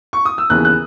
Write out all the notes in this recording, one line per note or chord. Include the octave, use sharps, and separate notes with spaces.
C#6
D#6
E6
D#2 C#3 E3 B3 F#6
F#6